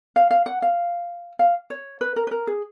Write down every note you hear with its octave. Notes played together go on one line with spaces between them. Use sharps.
F5
F5
F#5
F5
F5
C#5
B4
A#4
B4
A#4
G#4